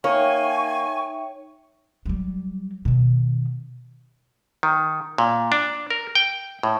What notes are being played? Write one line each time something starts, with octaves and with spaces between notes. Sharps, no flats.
A#3 D#4 C#5 E5 G5 G#5 C#6
F#3 G3
B2 D#3
D#3
A#2
D4
A#4
G5
A2